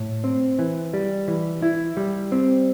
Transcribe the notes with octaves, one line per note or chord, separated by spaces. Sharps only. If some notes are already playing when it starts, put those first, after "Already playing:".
Already playing: A2
C4
E3
G3
E3
E4
G3
C4